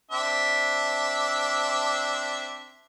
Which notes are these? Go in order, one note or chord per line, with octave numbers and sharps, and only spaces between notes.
C4 D4 E5